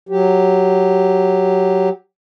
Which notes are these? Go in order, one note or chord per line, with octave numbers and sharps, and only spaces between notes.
F#3 G4